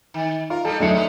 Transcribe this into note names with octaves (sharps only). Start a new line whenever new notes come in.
D#3
F4 A#4
G3 A#3 D#4 A4
F#2 D3 G#3 A3 C4 D4 E5 C#7
C#4 D#4 B4